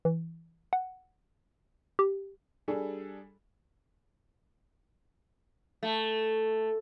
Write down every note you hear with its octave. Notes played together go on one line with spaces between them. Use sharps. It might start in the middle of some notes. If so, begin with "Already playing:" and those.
E3
F#5
G4
G3 D4 G#4 A4
A3